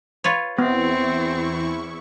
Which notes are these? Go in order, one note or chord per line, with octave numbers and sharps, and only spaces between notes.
F4 B4 C#5
E2 B3 C4 E4 C#6